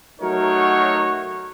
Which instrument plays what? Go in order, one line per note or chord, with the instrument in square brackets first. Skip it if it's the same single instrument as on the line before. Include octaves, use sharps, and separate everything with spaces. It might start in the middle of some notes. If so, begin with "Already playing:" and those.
[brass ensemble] F#3 A3 D#4 F#4 A#4 C#5